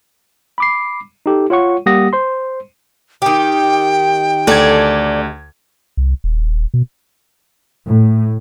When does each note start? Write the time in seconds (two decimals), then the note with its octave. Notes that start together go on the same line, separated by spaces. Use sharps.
0.58 B5 D6 C7
1.26 D#4 G4 A4
1.50 F4 C#5 F#5 C#6
1.86 G3 A#3 G4 F#5 D#6 A#6
2.13 C5 C6
3.22 D#3 G4 G5
4.47 D2 A4 D5 G#6
5.97 C2
6.24 D#1
6.74 B2
7.87 A2